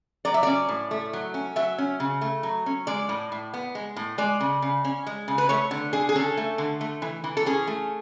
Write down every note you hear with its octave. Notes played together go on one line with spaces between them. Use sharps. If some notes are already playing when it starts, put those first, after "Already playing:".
F#3 D5
E5
C#4 D5
A2
A3
F#3
C#4
F#3 E5
C#4
C#3
A3
F#3
C#4
G#3 D5
A2
A2
B3
G#3
A2
G#3 D5
C#3
C#3
C#4
G#3
C#3
B4
A3 C#5
D3
D3 G#4
G#4
C#4 A4
A3
D3
A3
E3
E3
A4
C#4 G#4
A3